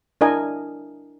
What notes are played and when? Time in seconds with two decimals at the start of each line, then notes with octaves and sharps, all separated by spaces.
0.21 D4 E4 A#4 D#5 G#5